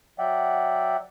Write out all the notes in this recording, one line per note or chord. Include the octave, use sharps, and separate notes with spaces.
F#3 D5 E5 F#5 G5